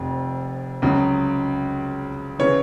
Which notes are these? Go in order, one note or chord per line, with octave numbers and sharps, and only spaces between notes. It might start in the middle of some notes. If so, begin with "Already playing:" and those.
Already playing: F1 F2
C#2 C#3 F#3
C#3 E3 C#5